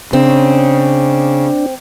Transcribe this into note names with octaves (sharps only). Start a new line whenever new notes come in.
C#3 C4 D4